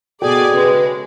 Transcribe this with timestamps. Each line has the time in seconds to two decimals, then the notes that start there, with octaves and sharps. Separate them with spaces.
0.22 B2 F#4 G#4 A4 D5 G5 G#5
0.54 C#3 G#3 B4